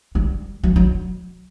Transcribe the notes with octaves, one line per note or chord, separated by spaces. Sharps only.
G3
F#3
F#3